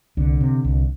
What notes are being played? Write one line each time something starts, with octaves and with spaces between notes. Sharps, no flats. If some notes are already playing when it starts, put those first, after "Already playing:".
C2 D3
C3
C2